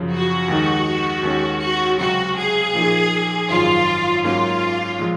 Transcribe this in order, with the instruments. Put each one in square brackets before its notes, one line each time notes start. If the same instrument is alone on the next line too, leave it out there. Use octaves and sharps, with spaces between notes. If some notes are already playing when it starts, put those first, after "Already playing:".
Already playing: [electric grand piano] F#2 C#3 F3
[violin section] F#4
[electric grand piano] D#2 D#3 G#3 D#4
D#2 D#3 G#3 C#4
[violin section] F#4
[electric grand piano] C#2 C3 F#3 [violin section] F#4
[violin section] G#4
[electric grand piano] A#2 F3 A#3 D#4
[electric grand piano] G#1 F#2 D#3 F#3 C#4 [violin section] F4
[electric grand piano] G#2 F#3 A#3 C#4 [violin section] F4
[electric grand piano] A#2 F3 G#3